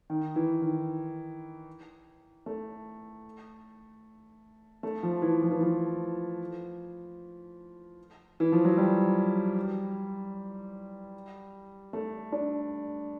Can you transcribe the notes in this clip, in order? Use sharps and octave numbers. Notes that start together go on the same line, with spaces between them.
D#3
E3
D#3
A3
A3
F3
E3
F3
E3
F3
E3
F3
F#3
G3
A3
D4